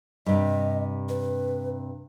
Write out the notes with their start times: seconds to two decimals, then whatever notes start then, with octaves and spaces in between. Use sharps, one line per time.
0.26 G2 C3 D#5
1.09 B4